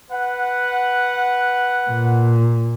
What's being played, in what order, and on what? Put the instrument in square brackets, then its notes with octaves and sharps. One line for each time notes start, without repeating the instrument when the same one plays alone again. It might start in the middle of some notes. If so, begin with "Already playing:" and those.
[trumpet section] B4 F#5
[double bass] A#2